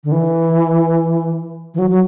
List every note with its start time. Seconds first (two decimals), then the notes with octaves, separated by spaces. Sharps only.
0.04 D3
0.12 E3
1.74 E3
1.78 F#3
1.90 F#3